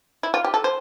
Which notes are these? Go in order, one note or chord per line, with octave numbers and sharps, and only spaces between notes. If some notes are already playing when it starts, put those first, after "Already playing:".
E4
F4
G4
A4
C5